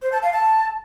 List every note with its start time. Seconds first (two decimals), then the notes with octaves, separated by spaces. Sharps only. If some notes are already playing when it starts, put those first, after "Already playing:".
0.02 C5
0.12 A5
0.22 F5
0.33 A5